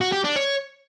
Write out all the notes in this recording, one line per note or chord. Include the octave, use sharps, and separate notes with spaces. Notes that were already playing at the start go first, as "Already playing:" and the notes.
F#4
G4
D4
C#5